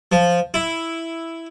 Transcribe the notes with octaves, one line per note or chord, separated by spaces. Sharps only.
F3
E4